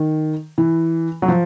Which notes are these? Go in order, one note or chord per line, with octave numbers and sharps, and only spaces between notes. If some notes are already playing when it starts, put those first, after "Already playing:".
Already playing: D#3
E3
F#3
F3